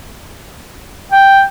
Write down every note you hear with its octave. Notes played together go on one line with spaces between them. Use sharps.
G5